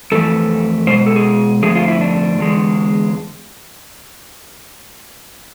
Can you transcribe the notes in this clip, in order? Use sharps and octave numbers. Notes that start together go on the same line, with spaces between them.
F2 E3 A3 A4
B2 G#3 C5
A4
G#4
F2 D3 F3 A3 G#4
F4
E4
D4
E2 D3 G#3